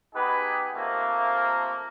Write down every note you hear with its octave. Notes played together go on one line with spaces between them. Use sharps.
B3 D#4 G4 G#4 B4
C3 F3 A3 A#3